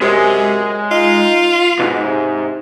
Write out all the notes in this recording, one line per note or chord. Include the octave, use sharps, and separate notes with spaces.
F#2 C3 G#3
D#4 F4
B1 G#2 B2
C3